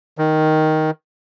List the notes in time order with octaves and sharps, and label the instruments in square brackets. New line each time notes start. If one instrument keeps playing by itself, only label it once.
[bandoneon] D#3